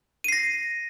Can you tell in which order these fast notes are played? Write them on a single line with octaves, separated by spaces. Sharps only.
D#7 C7 A#6